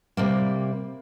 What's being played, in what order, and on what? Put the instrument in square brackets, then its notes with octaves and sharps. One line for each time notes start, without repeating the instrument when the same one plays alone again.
[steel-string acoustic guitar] C3 G3 A#3